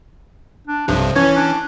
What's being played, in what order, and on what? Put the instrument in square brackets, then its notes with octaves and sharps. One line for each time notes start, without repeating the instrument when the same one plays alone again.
[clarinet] D4
[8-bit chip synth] B1 G2 C3 [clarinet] F3
[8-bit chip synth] E3 C#4 [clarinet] C#5
[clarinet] D4